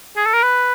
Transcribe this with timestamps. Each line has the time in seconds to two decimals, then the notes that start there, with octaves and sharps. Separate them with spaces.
0.17 G#4
0.26 A4
0.34 A#4
0.43 B4